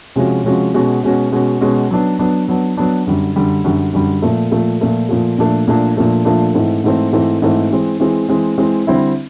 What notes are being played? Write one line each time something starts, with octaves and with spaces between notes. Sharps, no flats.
C3 F3 G#3 C#4 F#4
C3 F3 G#3 C#4 F#4
B2 G#3 C#4 F#4
B2 G#3 C#4 F#4
B2 G#3 C#4 F#4
B2 G#3 C#4 F#4
F#3 B3 D4
F#3 B3 D4
F#3 B3 D4
F#3 B3 D4
F#2 D3 G3
F#2 D3 G3
F#2 D3 G3
F#2 D3 G3
A#2 F3 A3
A#2 F3 A3
A#2 F3 A3
A#2 F3 A3
A#2 F3 A3 D4
A#2 F3 A3 D4
A#2 F3 A3 D4
A#2 F3 A3 D4
G#2 E3 A3 C4
G#2 E3 A3 C4
G#2 E3 A3 C4
G#2 E3 A3 C4
E3 G#3 C4
E3 G#3 C4
E3 G#3 C4
E3 G#3 C4
D3 G3 C4 E4